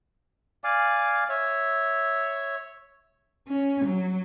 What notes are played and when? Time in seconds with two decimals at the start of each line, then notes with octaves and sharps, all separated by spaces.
0.64 D5 F5 G#5 D6
1.29 C#5 E5
3.48 C#4
3.86 F#3